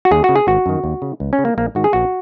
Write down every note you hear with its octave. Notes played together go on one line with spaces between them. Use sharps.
F#4
D#2 G#4
F#4
C#3
G#4
G#1 F#4
F#2 D#3
D#2
C#3
C#2
C#4
C#3
A#3
A#1 A#3
G#2 D#3 F#4
G#4
A#1 F#4